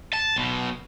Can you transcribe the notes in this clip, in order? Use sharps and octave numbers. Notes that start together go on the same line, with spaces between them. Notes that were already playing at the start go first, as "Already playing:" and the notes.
A5
B1 B2